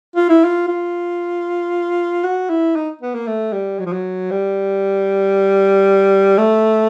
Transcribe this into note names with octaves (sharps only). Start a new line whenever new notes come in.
F4
E4
F4
F4
F#4
E4
D#4
B3
A#3
A3
G3
F#3
F3
F#3
G3
A3